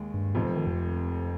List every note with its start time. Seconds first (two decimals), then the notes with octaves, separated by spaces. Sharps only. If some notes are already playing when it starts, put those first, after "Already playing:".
Already playing: D#2 D#3 G#3
0.14 G2
0.35 F1 F2 G#2 C3
0.45 F3
0.56 D#3
0.67 F2